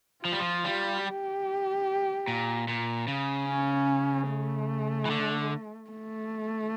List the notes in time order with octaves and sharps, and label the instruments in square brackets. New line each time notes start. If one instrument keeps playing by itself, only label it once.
[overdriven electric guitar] F3 [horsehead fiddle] F4
[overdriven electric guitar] G3
F3
G3
[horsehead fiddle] G4
[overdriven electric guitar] A#2
A#2
C#3
[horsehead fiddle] C#4
A3
[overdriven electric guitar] E3
D3
[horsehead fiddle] A3